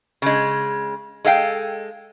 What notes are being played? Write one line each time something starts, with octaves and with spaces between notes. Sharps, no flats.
C#3 G#3
G#3 A4 F5 G5